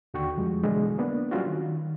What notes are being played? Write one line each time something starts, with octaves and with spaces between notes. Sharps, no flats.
D#2 D3 F#4 G5 C#6
F2 F3 G3 G#3
B2 D3 E3 F#3 G#3
A#3 B3 D4
F#3 G3 C#4 F4 F#4
D#3